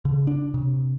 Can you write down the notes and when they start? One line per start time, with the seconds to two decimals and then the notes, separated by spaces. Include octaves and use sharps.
0.05 C#3
0.27 D4
0.54 C3